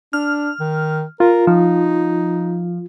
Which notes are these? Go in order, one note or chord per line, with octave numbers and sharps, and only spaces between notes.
D4 F6
D#3
F4 A#4
F3 D#4